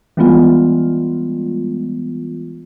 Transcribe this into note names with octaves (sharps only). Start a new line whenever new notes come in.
E3 G3 G#3 B3 F4